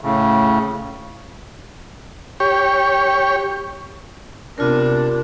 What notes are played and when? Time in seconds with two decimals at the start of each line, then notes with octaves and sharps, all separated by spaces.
0.01 A2 C#3
2.40 G4 C#5
4.58 C3 B3 D4 F4 A#4